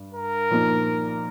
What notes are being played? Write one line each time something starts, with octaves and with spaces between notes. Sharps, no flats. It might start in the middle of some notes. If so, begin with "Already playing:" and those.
Already playing: G2
A#4
A#2 F3 A#3 D#4